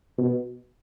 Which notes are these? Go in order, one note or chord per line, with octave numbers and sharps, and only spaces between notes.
B2